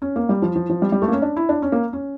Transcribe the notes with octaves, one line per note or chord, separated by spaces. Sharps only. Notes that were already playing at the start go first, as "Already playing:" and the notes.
C#4
A#3
G3
F3
F3
F3
G3
G3
A3
A#3
C#4
D4
E4
D4
C#4
A#3
C#4